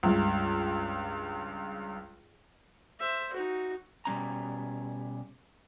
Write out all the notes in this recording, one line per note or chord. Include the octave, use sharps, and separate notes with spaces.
C#2 G2
C5 E5
D#4 F#4
B2 G3 C#4 A#5